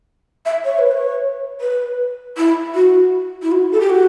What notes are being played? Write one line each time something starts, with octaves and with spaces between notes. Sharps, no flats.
E5
C#5
B4
C#5
B4
E4
F#4
E4
F#4
A4
G4
F#4